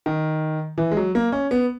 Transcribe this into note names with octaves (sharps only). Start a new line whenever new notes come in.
D#3
E3
G#3
F#3
A#3
C#4
B3